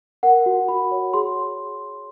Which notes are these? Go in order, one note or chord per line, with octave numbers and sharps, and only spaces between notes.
A#4 F#5
F#4
F#4 B5
C#5
G#4 C6